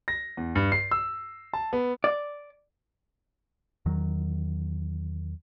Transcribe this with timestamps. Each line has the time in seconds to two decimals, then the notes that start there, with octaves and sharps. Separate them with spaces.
0.08 A#6
0.37 E2
0.55 G2
0.72 C7
0.91 E6
1.54 A5
1.73 B3
2.04 D5
3.86 E2 D#3 F#3